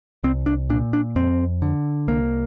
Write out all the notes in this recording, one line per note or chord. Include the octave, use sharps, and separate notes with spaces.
C2 C4
D4
A#2 D4
D4
F2 C4
D3
C2 A#3